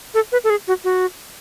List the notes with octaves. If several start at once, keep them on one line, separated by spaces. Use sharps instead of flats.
A4
B4
A4
G#4
F#4
F#4